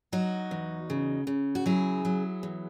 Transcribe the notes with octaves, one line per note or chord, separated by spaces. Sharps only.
F#3 D#4 F#4
E2
C#3
C#3
F#4
F#3 E4 G#4
F#3
E2